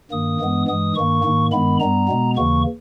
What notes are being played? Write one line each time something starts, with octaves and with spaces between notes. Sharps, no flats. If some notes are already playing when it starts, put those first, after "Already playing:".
G2 D#3 A#3 D#6
G2 E3 G#3 B3
G2 E3 G#3 D#6
G2 D#3 A#3 C#6
G#2 D#3 A#3
G2 D#3 G#3 B3 B5
G2 G3 B3 A#5
B2 G#3 B3
D#2 C#3 E3 A#3 C#6